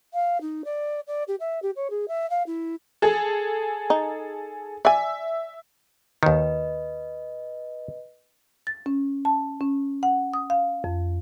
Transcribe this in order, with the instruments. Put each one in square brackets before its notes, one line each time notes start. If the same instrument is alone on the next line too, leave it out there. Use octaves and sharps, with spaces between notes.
[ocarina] F5
D#4
D5
D5
G4
E5
G4
C#5
G#4
E5
F5
E4
[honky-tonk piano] G#4 A4
[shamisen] D#4
[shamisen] D5 G#5 [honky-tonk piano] E5
[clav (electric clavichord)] D#2 D#3 [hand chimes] B4 D#5
[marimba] A6
C#4
A5
C#4
F#5
D#6
F5
F2